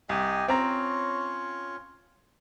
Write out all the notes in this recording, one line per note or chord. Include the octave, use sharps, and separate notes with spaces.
C2 G4 D#5 G#5
C4 C#4 F4 C#5 A#5